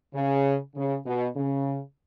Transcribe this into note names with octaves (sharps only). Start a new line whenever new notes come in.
C#3
C#3
B2
C#3